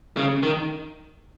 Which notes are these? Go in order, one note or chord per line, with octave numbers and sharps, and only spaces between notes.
C#3
D#3